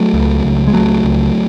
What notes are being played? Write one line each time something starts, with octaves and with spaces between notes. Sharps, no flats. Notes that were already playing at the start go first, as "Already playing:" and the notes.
Already playing: F#3 A3
C#2
C#2
G#3
C#2 F#3 A3
C#2